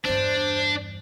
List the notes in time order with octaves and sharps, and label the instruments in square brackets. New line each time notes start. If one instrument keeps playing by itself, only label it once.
[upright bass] E2 G2 [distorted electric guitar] D4 [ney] C5